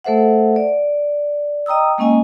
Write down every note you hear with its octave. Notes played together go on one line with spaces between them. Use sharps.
A3 A4 C5 E5 F#5
D5
D#5 G5 A#5 D#6 E6
G#3 A#3 C#4 D#5 G#5